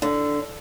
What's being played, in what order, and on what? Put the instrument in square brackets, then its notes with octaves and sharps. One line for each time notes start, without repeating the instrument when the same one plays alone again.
[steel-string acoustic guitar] D3